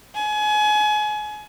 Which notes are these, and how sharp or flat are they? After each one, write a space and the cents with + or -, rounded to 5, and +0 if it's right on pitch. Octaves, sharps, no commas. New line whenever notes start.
G#5 +30